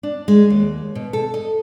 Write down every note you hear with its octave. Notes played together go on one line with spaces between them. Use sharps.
D4
G#3
D#2
B2
A4
D#5